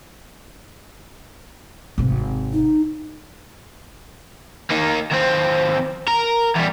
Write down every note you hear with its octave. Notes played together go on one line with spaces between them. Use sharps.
G#1 C3
D#4
A#3 D#4
D#2 C4
A#4
E2 G3